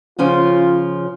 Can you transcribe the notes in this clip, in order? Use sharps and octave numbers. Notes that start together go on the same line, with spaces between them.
C#3 F3 C#4 F4